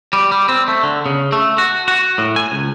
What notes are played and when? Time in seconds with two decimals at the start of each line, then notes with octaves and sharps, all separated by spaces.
0.13 G3
0.32 G3
0.49 C4
0.68 A3
0.83 D3
1.06 C#3
1.32 A3
1.58 F#4
1.88 F#4
2.18 A2
2.36 G#5
2.52 C#2